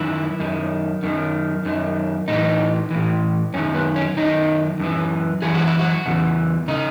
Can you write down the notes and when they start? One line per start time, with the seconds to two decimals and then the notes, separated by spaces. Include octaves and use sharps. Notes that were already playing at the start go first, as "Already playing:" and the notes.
Already playing: F#2 D#3 E4
0.40 F#2 D#3
1.03 F#2 D#3
1.65 F#2 D#3
2.28 A2 E3 D#4
2.91 A2 E3
3.54 F#2 D#3 C#4
3.74 B3
3.96 C#4
4.17 F#2 D#3 D#4
4.80 F#2 E3
5.42 F#2 E3 G#4
5.55 F#4
5.67 E4
5.79 F#4
6.06 E2 C#3 E3
6.68 C#3 D#4